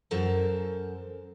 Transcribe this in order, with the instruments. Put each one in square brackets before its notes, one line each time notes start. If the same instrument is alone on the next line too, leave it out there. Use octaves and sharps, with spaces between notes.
[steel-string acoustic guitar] F#2 A4 A#4 C5